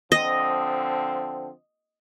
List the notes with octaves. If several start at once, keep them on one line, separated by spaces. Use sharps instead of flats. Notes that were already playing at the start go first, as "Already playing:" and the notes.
D3 F3 C4 D#5